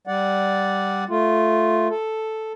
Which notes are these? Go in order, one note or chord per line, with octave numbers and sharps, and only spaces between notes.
G3 D5 F#5
A3 F4
A4